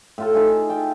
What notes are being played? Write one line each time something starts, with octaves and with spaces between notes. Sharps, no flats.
A2 F4 A4
D#4 F4 G#4 E5
G5 A5